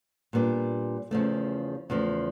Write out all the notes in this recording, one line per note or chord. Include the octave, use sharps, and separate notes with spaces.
A#2 G3 B3 D4
E2 C#3 F3 A3
E2 C#3 F3 A3